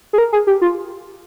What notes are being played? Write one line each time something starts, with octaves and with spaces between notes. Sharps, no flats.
G#4
A#4
G#4
G4
F4